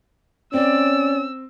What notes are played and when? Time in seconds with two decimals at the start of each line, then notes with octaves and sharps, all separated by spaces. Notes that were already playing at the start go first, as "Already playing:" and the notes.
0.54 C4 C#4 D5 E6